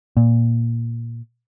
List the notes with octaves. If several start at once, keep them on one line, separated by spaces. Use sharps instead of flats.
A#2